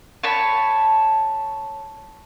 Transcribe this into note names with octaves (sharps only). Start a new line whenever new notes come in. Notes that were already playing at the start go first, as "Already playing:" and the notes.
C#5 A5 B5